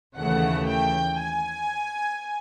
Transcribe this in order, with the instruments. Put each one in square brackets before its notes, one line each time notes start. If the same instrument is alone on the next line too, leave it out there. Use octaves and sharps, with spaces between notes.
[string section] D#2 C#3 E3 A3 F#5
G5
G#5